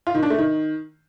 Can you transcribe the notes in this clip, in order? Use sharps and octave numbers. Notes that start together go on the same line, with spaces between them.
F4
D#3
D4
A3
D#3